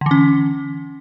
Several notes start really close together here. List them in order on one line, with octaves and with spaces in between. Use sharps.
D3 E3 C#4